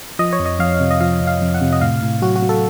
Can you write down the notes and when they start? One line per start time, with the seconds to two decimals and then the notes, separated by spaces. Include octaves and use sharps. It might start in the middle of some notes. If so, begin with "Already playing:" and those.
0.19 F3 D#5
0.33 C#5
0.39 F2
0.46 D#5
0.59 F2 F5
0.80 C3
0.91 D#5
1.00 F3 F5
1.21 F2
1.27 F5
1.41 F2
1.54 F#5
1.61 C3
1.73 D#5
1.81 A2 F5
2.02 A2
2.22 F#3 F#4
2.36 F#4
2.42 F#3
2.49 A4